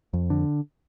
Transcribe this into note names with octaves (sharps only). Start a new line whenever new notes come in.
F2
D3